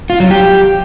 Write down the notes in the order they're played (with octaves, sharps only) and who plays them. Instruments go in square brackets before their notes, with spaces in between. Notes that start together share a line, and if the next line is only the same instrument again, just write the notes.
[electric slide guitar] F4
F#3
G4